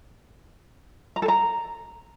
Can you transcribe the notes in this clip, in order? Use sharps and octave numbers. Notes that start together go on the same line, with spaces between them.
A#5
A4
A#5